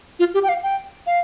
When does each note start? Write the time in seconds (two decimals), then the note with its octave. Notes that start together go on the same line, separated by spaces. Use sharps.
0.19 F4
0.34 G4
0.43 G5
0.49 F5
0.63 G5
1.07 F5